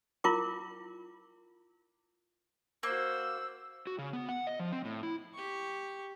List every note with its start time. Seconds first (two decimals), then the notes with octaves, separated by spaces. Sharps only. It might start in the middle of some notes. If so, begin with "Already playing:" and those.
0.24 E4 F4 A#4 D6
2.83 A#3 F#4 C5 E6
3.87 F#4
3.98 C#3
4.13 B3
4.29 F#5
4.47 D#5
4.60 F3
4.72 C4
4.85 A2
5.03 E4
5.34 G4 C#6